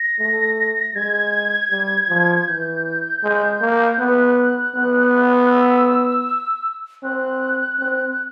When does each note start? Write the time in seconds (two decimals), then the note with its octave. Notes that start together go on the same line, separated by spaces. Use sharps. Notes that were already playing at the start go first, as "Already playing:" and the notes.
Already playing: A#6
0.19 A3
0.95 G#3 G#6
1.71 G3
2.09 F3
2.47 E3 G6
3.23 G#3
3.61 A#3
3.99 B3 F#6
4.75 B3
5.51 E6
7.03 C4 F#6
7.79 C4